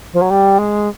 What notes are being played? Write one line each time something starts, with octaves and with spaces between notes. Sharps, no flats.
F3
F#3
G3
G#3